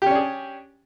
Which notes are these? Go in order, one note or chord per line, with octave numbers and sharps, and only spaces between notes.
C#4 D4 G4 G#4